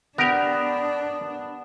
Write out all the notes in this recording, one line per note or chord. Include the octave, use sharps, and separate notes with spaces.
B3 D4 G4 A#4